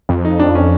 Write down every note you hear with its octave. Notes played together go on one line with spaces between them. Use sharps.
F2
D#4
D4
C#4